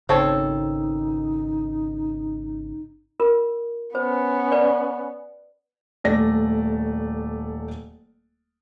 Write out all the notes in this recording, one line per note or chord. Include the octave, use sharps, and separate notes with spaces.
G#1 C#3 C4 D#4 A4 C#5
F4 A#4
B3 C#4 C5
B4 D5
D#1 A3 D5 A#6